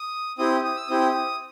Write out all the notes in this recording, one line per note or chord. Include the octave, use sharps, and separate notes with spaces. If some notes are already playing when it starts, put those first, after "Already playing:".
Already playing: D#6
C4 E4 G4 D#6
D#6
E6
C4 E4 G4 D#6